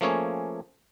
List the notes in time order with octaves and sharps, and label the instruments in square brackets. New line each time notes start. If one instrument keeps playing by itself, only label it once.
[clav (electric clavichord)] F3 A3 A#3 C#4 G#4 C#5